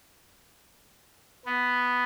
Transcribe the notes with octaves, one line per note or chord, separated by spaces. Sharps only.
B3